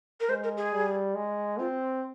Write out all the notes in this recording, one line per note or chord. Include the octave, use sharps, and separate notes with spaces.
A#4
G#3 C5
A#4
G#4
G3
G#3
C4 F4